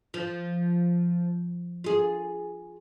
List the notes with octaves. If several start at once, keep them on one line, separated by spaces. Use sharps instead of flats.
F3
F4 G#4